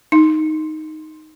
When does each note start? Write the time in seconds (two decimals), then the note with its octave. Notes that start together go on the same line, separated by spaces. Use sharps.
0.12 D#4